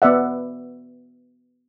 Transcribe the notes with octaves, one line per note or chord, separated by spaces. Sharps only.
B3 D5 E5 F#5